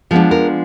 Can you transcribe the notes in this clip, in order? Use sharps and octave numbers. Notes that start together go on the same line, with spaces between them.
F3 G#3 B3 D4
A#4